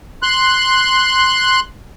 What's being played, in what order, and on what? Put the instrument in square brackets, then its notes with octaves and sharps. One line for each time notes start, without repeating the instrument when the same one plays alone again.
[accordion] C6 F#6